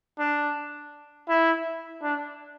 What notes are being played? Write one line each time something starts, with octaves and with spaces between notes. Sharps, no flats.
D4
E4
D4